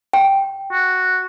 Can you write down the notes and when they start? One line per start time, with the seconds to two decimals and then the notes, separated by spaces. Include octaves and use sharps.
0.13 G5
0.72 F#4